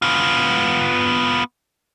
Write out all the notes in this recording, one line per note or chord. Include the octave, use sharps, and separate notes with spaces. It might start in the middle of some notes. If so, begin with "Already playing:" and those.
B3 F4